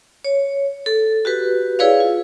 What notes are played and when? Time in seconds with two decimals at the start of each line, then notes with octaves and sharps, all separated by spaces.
0.24 C#5
0.86 A4
1.25 F#4 G4 B4
1.79 E4 G#4 B4 C#5 D5 F5
2.00 F4